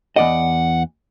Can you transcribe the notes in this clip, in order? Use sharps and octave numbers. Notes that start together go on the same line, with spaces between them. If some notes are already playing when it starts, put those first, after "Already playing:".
E2 D5 D#5 F#5